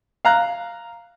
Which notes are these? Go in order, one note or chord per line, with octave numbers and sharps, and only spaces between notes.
F5 A#5 F#6